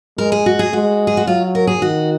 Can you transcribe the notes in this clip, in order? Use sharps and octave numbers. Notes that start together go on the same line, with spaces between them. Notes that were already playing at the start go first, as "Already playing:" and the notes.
G#3 A#4
G#4
F#4
G#4
G#3 F#4
G#4
F#4
F#3 F4
A#4
G#4
D#3 F#4